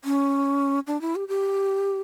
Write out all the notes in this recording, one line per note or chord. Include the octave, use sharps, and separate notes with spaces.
C#4
D4
E4
G4
G4